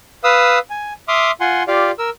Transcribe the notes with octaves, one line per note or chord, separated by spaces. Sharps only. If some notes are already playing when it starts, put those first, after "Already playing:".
B4 F5 D#6 E6
G#5
E5 C6 D6 D#6 F6
F4 F#5 G#5 C6
F4 G4 D5 F5
A#4 E6